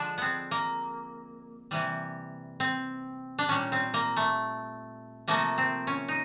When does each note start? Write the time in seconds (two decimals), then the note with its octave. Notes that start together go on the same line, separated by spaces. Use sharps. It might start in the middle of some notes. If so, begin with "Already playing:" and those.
Already playing: D3 F3 G#3 D4
0.18 B3 C4
0.51 A#3
1.71 C3 E3 G3
2.60 C4
3.39 D4
3.49 A#2 G3 C#4
3.72 C4
3.94 A#3
4.17 A3
5.28 C3 F3 A3 A#3
5.58 C4
5.87 C#4
6.08 D#4